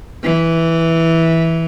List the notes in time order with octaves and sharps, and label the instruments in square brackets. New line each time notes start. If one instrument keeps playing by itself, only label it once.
[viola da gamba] E3